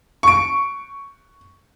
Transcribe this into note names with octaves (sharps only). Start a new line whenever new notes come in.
C#6 D7